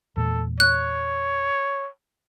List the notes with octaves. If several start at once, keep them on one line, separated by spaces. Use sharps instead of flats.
E2 A#2 G#3 A4
C#5 F#6